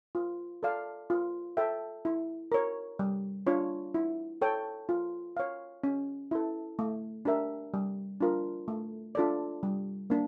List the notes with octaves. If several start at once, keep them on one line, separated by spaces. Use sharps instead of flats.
F4
A4 D5 F5
F4
A4 E5 G5
E4
A#4 C#5
G3
D4 F4 C#5
E4
A4 C#5 G5
F4
C#5 F5
C#4
E4 A4
A3
D4 G4 A#4 E5
G3
D4 F4 A#4
A3
D4 F4 A4 D5
G3
A#3 D4